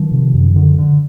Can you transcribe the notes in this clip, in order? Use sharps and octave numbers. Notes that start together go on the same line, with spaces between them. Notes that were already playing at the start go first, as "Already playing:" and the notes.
Already playing: D#3 F3
C3
F#2
D3
D3